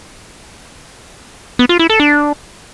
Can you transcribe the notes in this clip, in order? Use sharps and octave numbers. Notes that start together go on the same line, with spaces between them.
B3
F4
E4
A4
D4